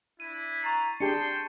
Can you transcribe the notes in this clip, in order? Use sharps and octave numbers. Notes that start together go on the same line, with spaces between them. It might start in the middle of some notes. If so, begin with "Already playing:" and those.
D4 E4 D#7
A#5 C#6 A6 C7
D4 G4 G#4 G5 A5 C6 C#7